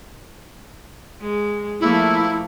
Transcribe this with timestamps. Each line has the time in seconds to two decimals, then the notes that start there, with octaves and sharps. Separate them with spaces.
1.21 G#3
1.80 F3 A3 A#3 E4